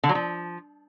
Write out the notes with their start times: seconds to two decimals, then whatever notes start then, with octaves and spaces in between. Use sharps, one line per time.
0.03 D3
0.09 F#3
0.15 F3